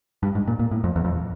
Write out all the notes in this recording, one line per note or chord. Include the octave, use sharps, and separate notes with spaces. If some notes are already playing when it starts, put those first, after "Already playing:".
G2
G#2
A#2
A#2
A2
F2
E2
F2